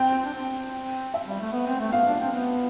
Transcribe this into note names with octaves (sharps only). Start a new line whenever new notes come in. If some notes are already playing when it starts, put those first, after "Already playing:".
Already playing: C4 G5
D4
C4
E5
G3
A3
B3
C4
A3
B3 F5
D4
C4
B3